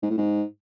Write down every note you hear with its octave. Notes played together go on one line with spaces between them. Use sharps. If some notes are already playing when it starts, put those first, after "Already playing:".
G#2
A2
G#2